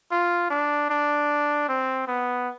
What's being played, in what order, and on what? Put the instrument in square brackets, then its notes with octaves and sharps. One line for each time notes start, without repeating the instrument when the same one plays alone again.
[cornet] F4
D4
D4
C4
B3